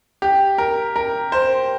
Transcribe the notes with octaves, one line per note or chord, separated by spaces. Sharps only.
G4
A#4
A#4
C5